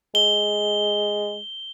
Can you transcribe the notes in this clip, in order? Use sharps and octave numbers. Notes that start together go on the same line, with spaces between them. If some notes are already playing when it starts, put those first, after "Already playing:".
G#3 G7